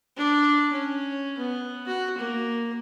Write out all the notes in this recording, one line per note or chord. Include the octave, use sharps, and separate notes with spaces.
D4
C#4
B3
F#4
A#3